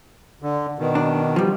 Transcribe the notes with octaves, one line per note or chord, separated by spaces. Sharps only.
D3
B2 D#3
D4
F3 G3